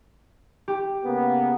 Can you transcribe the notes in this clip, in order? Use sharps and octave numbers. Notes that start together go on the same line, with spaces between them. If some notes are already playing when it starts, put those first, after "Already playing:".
G4
C#3 A#3 B3